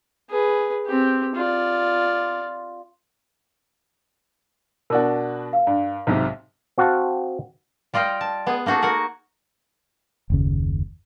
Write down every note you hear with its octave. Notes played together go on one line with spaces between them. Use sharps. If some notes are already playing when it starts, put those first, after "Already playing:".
G#4 B4
C4 G4
F4 D5
B2 D4 F#4 A#4
F5
G2
B1 G#2 C3
C4 F#4 F5 F#5 A5
G3 F4 D#5 F5 G5
A5
B3 G#4
A#3 D#4 F#4 G#4 A4
F#4 A#4 F#5 G#5
F#1 D#2 C#3